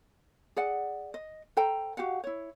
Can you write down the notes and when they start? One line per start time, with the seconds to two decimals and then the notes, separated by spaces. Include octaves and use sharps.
0.56 G#4 D5 F#5
1.14 D#5
1.57 A4 C5 G5 A#5
1.97 F#4 G4 F5 F#5
2.24 E4 C#5